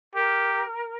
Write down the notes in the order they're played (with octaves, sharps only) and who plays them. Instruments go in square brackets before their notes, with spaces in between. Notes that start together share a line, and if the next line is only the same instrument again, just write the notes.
[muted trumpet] G4 [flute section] A#4